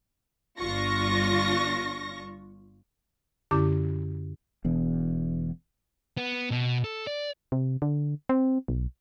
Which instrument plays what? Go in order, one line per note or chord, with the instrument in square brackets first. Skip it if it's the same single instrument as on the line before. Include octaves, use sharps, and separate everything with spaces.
[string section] G1 D4 F4 C#6 A#6
[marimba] F#2 D3 C#4 E4 G4 D6
[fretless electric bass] E1 E2
[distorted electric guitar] B3
B2
A4
D5
[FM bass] C3
D3
C4
B1